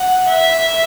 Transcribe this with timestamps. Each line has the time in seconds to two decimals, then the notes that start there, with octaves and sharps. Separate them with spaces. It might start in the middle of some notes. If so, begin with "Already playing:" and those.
Already playing: F#5
0.29 E5